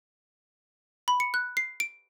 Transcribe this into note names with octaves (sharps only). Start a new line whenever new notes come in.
B5
C#7
F#6
C7
D7